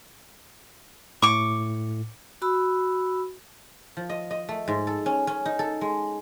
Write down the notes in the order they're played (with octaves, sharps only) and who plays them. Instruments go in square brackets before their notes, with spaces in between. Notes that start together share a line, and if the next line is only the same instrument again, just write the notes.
[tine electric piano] A2 [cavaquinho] C#6 D6
[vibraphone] F#4 B5 E6
[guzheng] F3
D#5
D#5
A3
G#2
A4
C#4
C#4
D#4
A4
G#3